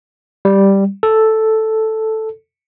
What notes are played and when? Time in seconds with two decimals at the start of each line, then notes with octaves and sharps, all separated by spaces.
0.45 G3
1.03 A4